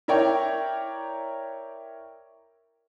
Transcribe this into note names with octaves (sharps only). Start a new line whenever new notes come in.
E4 A#4 C#5 D5 G5 A#5